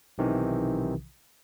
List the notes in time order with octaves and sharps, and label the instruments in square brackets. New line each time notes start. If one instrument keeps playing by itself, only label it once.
[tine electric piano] B1 C3 D#3 E3